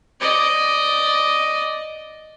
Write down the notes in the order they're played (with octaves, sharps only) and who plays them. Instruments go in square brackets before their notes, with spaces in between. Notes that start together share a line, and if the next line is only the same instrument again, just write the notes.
[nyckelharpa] D5 D#5